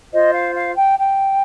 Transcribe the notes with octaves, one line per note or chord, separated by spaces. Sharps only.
F4 C5 D#5
F5
F5
G5
G5